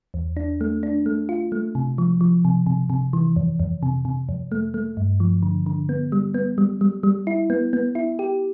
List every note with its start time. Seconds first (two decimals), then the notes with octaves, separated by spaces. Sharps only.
0.14 E2
0.37 D4
0.61 A3
0.83 D4
1.06 A3
1.29 F4
1.52 A3
1.75 C3
1.98 F3
2.21 F3
2.45 C3
2.66 C3
2.90 C3
3.13 E3
3.36 F2
3.60 F2
3.83 C3
4.05 C3
4.29 F2
4.52 A3
4.74 A3
4.97 G2
5.20 F3
5.43 D3
5.66 D3
5.89 B3
6.12 G3
6.34 B3
6.58 G3
6.81 G3
7.03 G3
7.27 E4
7.50 B3
7.73 B3
7.95 E4
8.19 G4